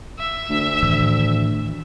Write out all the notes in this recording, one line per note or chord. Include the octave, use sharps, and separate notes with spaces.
E5
D2
A2 D#3 E3